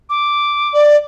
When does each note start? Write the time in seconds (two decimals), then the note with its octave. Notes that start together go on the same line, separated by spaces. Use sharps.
0.10 D6
0.74 D5